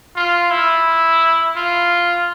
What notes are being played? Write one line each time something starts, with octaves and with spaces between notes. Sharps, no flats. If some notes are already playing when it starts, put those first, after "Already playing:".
F4
E4
F4